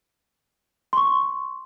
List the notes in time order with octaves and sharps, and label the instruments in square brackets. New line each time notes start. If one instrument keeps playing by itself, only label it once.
[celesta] C6 C#6